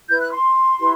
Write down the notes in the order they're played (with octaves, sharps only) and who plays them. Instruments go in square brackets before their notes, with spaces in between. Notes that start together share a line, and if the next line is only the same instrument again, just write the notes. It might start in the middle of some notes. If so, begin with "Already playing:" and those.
[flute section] E4 B4 G6
F#6
C6
E4 G4 B4